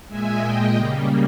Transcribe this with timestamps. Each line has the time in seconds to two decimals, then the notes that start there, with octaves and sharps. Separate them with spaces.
0.08 A#2 G#3 E5 G#5
0.41 A#2 G#3 D#5 G5
0.74 C#3 G3 A#3